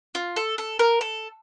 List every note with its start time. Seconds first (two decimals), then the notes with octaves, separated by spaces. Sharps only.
0.15 F4
0.36 A4
0.58 A4
0.79 A#4
1.01 A4